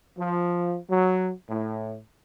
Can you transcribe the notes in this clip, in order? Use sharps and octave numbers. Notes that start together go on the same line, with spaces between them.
F3
F#3
A2